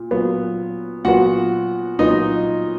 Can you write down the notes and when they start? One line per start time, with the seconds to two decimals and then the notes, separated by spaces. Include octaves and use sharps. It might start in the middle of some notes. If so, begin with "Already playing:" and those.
Already playing: A#2
0.11 A#2 F#3 B3
1.05 A#2 F#3 B3 F#4 F#5
1.99 A#2 F#3 B3 D#4 D#5